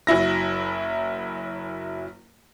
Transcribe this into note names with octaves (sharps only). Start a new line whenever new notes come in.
F#1 F#3 E4 A#6